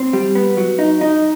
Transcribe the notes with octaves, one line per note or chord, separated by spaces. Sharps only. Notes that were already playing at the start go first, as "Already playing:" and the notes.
Already playing: C4
G3
B3
F#3
D#4
D#4